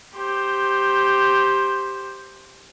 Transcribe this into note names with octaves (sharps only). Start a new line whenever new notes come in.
G4 C5